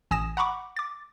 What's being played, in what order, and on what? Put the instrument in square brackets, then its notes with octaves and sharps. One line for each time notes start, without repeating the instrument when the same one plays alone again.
[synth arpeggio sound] A1 G#5 D#6 A#6 E7
F#5 A#5 B5 C#6 D6
D6 A6